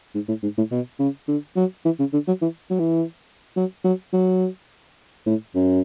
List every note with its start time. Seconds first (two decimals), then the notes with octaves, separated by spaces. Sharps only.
0.14 G#2
0.28 A2
0.43 G#2
0.57 A2
0.71 B2
0.99 C#3
1.28 D3
1.56 F#3
1.85 E3
1.99 C#3
2.13 D3
2.27 F#3
2.42 E3
2.70 F#3
2.79 E3
3.56 F#3
3.84 F#3
4.13 F#3
5.26 A2
5.55 F#2